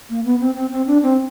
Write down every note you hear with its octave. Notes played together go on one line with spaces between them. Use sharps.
A#3
B3
C4
C4
C4
D4
C4